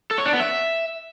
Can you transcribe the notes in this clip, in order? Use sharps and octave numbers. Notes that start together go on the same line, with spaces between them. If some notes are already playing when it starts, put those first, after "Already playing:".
A4
C#5
D4
B3
E5